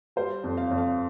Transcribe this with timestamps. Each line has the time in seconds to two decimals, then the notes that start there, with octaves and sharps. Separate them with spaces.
0.16 G3 C5
0.43 F2
0.57 F5
0.71 F2
0.78 F5